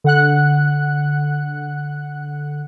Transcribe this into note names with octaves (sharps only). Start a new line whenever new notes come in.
D3 F#5 F#6